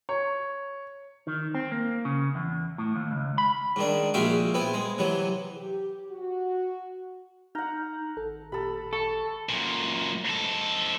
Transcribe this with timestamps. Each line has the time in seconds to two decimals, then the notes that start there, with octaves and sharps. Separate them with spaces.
0.09 C#5
1.27 D#3
1.55 C4
1.72 A#3
2.05 C#3
2.35 E2
2.78 A2
2.95 D#2
3.11 C#2
3.38 B5
3.76 G#2 D#3 D4
4.14 A#1 G#3 F#4 E5 F5 G5
4.54 B3 C4 E4
4.74 G#3
4.98 C3 E3 F#3
5.56 G4
6.10 F#4
7.55 D#4 F#5 A#5 F6 G6
8.17 G#1 A4
8.52 A#2 G4 A4 B5
8.93 A4 A5 C#6
9.49 F#2 A#2
10.30 G#2 A4